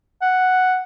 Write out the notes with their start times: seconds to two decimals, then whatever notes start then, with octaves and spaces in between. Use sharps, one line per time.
0.22 F#5